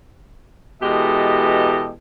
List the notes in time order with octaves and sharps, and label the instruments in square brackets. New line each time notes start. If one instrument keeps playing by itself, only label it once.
[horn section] B2 E3 G#3 G4 A4 D#5